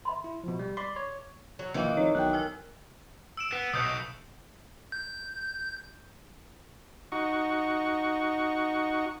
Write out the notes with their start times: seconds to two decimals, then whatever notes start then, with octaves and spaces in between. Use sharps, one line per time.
0.05 E5 B5 C6
0.24 E4
0.44 B2 F3
0.59 G3
0.77 D5 B5 C6 D6
0.96 C#5
1.59 F#3
1.74 A#1 D#3 E3 F5 E6
1.97 F1 D#4 C#5
2.15 B1 G5 F#6
2.33 A#4 G#5 E6
3.37 E6 D7 E7
3.52 B3
3.74 B1 B2 D#6 G6 C#7
4.92 G6
7.12 D#4 F#4 C#6